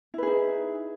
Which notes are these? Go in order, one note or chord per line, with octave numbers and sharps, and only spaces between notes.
D#4 E4 G#4 B4